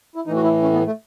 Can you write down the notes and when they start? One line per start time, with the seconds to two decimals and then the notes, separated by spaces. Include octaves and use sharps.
0.16 E4
0.27 A2 E3 D#4
0.36 F#4
0.44 E4
0.63 C#4
0.73 B3
0.86 A3